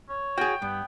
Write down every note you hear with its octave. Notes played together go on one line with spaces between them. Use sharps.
C#5
F#4 G#4 G5
G2 B3